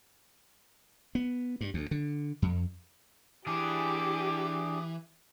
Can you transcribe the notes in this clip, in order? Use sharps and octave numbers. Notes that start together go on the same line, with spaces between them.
B3
G2
D2
D3
F2
E3 D4 G4 G#4 D6